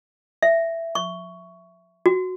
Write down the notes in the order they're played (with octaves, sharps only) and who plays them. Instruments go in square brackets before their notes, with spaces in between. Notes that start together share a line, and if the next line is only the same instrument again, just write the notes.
[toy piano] E5
C#6
F#4